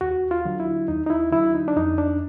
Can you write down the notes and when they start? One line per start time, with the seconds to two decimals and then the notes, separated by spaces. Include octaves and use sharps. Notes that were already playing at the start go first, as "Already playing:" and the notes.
0.01 D#2 F#4
0.31 F4
0.45 D3 F#3
0.60 E4
0.88 D#2 D#4
1.07 D#4
1.10 E4
1.32 D3 F#3 E4
1.55 D#4
1.68 D4
1.77 F2 D#4
1.98 D4